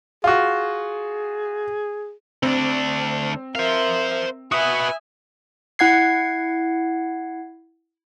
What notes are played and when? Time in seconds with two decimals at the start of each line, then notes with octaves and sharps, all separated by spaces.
0.24 F4 F#4 G#4
2.43 D2 C4 D4
3.55 A#4 C5 E5 F5
4.52 F#4 B4 E5 G#5 D#6
5.79 E4 F#5 G#6 C7